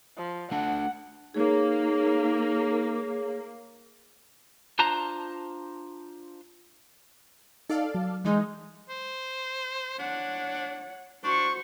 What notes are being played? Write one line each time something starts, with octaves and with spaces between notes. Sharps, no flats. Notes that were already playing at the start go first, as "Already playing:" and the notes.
F3
A3 D4 F#5 A5
A#3 D#4 G#4 C#5
D4 F4 C5 A5 A#5
D#4 A4 D5 F5
F#3
E3 G#3 D#4
C5
D4 C#5 F#5
D4 F#4 C5 C#6